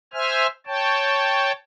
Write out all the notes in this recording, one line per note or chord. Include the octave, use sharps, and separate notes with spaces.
C5 E5 G#5 F6
C#5 G5 A5